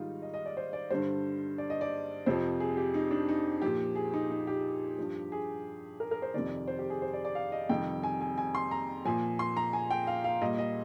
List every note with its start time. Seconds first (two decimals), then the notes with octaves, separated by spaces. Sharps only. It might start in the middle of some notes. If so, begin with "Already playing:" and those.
Already playing: G#2 D#3 G3 D#4 F4
0.22 D#5
0.34 D#5
0.46 D5
0.57 C5
0.73 D5
0.90 G2 D3 G3 C5
1.58 D5
1.70 D#5
1.81 D5
2.26 F2 C3 F3 C5
2.60 G#4
2.77 G4
2.94 D#4
3.11 D4
3.29 D#4
3.62 A#2 F3 G4
3.96 G#4
4.13 D#4
4.30 D#4
4.47 G4
4.98 G2 F3
5.32 G#4
6.00 A#4
6.11 A#4
6.22 C5
6.34 F2 C3 D#3 D5
6.68 C5
6.79 G4
6.90 G#4
7.02 C5
7.13 D5
7.25 D5
7.35 F5
7.52 D#5
7.69 F2 C3 D#3 G3 G5
8.03 G#5
8.21 G#5
8.38 G#5
8.55 C6
8.71 A#5
9.05 A#2 F3 G#5
9.39 C6
9.57 A#5
9.73 G#5
9.91 G5
10.07 F5
10.24 F5
10.41 A#2 G3 D#5
10.58 D#5